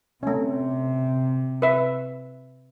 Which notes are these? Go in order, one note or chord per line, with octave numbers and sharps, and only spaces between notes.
C3 A3 C#4
B4 E5